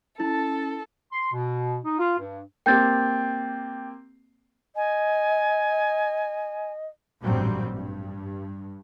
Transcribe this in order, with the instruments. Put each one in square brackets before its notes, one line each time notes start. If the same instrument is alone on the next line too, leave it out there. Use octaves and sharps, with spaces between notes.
[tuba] C#4 [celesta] E4 [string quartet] A4 [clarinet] A5
[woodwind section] C6
B2
D#4
F4
G2
[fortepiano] A#3 C4 G4 [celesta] G5 G6 A6
[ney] D#5 [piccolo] G#5
[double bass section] A1 G2 A#2 F#3 G3 C4
G2